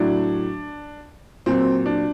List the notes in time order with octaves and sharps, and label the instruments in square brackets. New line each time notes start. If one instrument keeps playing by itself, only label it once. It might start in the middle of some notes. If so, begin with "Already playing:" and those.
Already playing: [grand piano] A2 F#3 D4
A#2 F#3 C4
D4